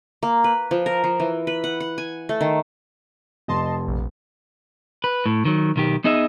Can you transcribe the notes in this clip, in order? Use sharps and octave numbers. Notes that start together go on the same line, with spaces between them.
A#3
B4
F3
A#4
F3
E3
B4
F#5
F#5
G#5
A3
D#3
F1 D#5 A5 C6
A#1
B4
A2
D#3 F#3
B1 D#3 G4
B3 D#4 G#4 D#5 E5